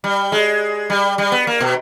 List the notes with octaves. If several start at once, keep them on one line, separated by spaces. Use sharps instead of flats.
G3
G#3
G3
G3
B3
A#3
B2